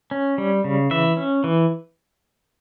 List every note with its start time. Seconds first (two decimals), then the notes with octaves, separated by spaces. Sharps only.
0.11 C#4
0.38 G3
0.64 C#3
0.91 E3 E5
1.17 C#4
1.44 E3